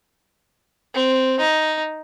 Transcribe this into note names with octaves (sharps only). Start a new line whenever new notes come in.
C4
D#4